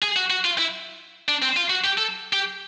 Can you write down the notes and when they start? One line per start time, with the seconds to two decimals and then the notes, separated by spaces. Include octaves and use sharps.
0.02 G#4
0.16 F#4
0.30 F#4
0.45 F4
0.58 E4
1.28 D4
1.42 C4
1.57 F4
1.70 F#4
1.84 G4
1.98 A4
2.33 G4